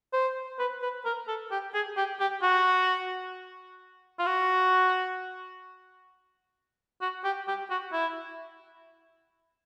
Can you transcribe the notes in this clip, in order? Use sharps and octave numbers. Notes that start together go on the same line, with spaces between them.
C5
B4
B4
A#4
A4
G4
G#4
G4
G4
F#4
F4
F#4
F#4
G4
G4
F#4
E4